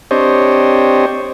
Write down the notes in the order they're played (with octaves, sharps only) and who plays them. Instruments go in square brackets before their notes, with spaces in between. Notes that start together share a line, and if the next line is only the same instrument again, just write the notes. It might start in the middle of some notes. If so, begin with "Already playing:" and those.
[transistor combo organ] C4 D4 G4 C5 C#5 D#5